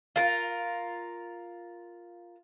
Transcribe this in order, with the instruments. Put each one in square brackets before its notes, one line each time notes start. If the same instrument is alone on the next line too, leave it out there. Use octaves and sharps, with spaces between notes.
[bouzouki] F4 A#4